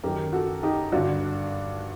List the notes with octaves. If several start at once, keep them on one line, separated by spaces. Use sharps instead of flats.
F#2 D#3 G4 A#4
F#4 A4
D#4 G4
G2 D3 D4 F#4